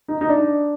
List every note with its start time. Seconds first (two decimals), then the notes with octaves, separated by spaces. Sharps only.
0.08 D#4
0.21 D#4
0.29 D4